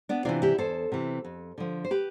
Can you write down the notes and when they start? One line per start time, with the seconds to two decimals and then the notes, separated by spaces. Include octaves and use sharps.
0.09 B3 D4
0.25 C3 E3 D4 F4
0.42 E4 G4
0.58 E2 A4 C5
0.92 C3 E3
1.25 F2
1.58 D3 F3
1.85 C5
1.91 G4 B4